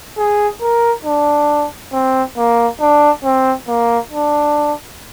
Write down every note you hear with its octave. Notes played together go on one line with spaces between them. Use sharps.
G#4
A#4
D4
C4
A#3
D4
C4
A#3
D4